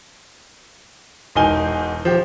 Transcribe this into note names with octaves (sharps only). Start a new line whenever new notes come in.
E1 E2 D#4 A#4 G#5 G7
F3 G4